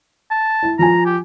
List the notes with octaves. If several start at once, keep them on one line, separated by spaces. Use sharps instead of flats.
A5
E4
F3 F4 G#5 A#5
G4